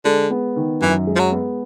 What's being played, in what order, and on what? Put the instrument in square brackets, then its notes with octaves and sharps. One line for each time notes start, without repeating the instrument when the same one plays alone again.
[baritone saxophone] D3 [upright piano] G#3
[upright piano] B3
D#3
[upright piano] F#2 [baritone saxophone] E3
[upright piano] G#3
[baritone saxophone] F3
F#3
[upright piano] B3